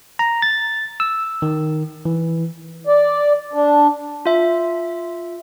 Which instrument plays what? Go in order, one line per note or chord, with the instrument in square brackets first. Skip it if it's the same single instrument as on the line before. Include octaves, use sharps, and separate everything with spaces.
[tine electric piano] A#5
A6
E6
D#3
E3
[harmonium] D5
D4
[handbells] F4 E5